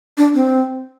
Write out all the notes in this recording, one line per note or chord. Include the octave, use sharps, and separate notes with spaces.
D4
C4